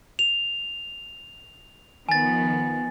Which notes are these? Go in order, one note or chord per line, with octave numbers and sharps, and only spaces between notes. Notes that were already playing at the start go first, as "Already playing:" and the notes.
F7
D#3 F3 B3 G#5 A6